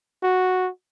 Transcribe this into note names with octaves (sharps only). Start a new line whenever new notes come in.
F#4